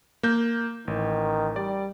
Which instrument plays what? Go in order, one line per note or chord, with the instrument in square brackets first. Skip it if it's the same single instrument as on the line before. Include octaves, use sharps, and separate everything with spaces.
[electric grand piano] A#3 G6
[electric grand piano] A1 [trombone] D#3
[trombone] G3 [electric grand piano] D5